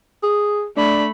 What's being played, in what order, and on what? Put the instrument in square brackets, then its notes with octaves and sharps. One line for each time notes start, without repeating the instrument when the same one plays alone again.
[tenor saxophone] G#4
[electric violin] A3 B5 [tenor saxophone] D4